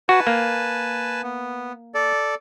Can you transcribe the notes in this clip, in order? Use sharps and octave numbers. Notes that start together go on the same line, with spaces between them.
F#4 B4 G#5 A5
A#3
B3
A4 D5